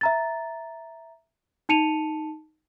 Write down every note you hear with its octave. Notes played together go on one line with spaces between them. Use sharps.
E5 A#5 A6
D#4 A5 C#7 D#7 F7